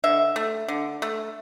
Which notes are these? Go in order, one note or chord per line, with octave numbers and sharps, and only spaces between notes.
D3 E5
A3
D3
A3